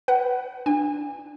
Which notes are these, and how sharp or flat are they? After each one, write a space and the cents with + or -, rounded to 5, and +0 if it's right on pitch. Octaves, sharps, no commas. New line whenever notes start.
B4 +0 F#5 +30
D4 +10 G#5 -30